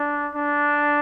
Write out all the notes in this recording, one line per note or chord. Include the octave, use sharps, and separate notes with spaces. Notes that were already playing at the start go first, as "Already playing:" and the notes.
Already playing: D4
D4